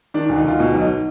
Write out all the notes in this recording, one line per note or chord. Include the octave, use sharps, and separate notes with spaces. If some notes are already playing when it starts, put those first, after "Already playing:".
D#3 D4
D2 D4
D#4
D2 F4
B2 D#4
B1
D#4